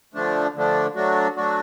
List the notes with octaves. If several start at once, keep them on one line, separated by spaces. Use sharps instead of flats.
D3 F3 A3 D4
D3 F3 A3 D4
F#3 A3 D4 F#4
F#3 A3 D4 F#4